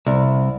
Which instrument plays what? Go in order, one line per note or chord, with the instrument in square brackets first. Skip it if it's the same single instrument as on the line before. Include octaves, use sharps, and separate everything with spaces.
[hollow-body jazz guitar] C2